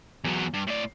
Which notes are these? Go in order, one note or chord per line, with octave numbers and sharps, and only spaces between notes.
E2 F#3
G2
A2 D5